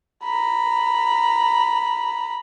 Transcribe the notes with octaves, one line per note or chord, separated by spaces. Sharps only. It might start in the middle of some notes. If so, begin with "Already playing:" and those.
A#5 B5